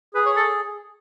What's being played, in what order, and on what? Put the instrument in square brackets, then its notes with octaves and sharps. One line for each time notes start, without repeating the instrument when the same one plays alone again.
[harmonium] G#4 [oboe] B4
[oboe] C#5
A4